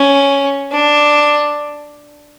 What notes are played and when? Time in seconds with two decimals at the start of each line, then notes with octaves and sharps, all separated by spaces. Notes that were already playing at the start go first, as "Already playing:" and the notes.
Already playing: C#4
0.72 D4